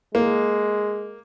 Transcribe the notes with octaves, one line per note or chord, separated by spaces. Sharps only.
G#3 A#3